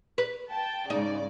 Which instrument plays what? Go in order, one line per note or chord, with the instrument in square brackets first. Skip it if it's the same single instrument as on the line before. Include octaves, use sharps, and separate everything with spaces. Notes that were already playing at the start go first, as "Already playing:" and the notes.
[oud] B4
[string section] G5 A5
[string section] G#2 C#3 D5 [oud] D#4